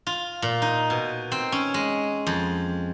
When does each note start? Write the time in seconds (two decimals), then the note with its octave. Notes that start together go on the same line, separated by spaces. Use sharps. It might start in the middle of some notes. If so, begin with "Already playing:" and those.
0.07 F4
0.42 A#2
0.62 D#4
0.90 B2
1.32 C4
1.52 C#4
1.74 G#3
2.27 F2